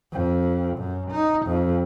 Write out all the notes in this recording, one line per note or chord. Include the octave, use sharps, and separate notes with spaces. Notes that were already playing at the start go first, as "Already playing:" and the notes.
F2
F#2
D#4
F2